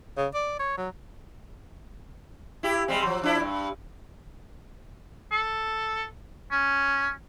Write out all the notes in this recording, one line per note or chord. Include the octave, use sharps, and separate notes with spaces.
C#3
D5
C#5
F#3
E4 G4
G3 G#3 C4
F3 F#3
F3 D4 E4
G2
A4
C#4